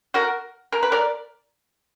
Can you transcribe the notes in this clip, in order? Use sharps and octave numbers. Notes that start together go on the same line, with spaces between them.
F#4 A#4
A#4
B4
A#4 D5